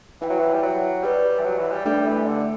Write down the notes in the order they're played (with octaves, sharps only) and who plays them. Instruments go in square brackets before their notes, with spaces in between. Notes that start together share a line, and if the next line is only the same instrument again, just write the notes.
[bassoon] E3 [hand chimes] E4 B4 E5 G5
[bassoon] F#3
E3
G3
F#3
[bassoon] G3 [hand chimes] G4 B4 D5
[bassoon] E3
F#3
E3
G3
[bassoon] G3 [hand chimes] A3 D4 A4 E5
[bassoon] E3
D3